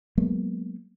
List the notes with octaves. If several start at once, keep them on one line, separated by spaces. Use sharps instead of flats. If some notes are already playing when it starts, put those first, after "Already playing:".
F#3 G#3 A#3 B3